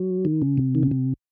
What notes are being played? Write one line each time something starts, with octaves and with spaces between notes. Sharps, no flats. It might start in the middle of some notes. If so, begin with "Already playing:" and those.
Already playing: F#3
D#3
C#3
C3
D#3
C#3
C3